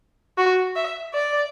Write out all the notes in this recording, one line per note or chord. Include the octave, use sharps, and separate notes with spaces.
F#4
E5
D5